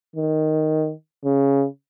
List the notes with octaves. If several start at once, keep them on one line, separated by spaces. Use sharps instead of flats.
D#3
C#3